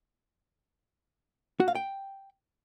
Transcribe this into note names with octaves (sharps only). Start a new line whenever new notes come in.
F#4
F5
G5